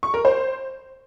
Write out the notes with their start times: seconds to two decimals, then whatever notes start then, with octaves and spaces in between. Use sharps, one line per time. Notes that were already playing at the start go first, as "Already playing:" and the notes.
0.03 C#6
0.14 A#4
0.25 C5